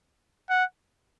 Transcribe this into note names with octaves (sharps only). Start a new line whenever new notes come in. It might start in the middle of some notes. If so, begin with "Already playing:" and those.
F#5